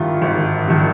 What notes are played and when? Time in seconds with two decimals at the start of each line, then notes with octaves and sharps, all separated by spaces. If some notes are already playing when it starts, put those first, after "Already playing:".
Already playing: G#1 G2 D#3 E4 F4
0.22 G#1
0.68 G2 D#3